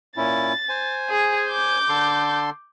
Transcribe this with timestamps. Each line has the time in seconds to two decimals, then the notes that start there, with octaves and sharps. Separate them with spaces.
0.17 A#2 C#4 E4 A6
0.69 C5 G#5
1.09 G#4
1.49 D6 G6
1.89 D3 A4 C6